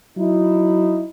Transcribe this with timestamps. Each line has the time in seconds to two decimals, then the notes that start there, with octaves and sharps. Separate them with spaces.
0.17 F#3 D#4 E4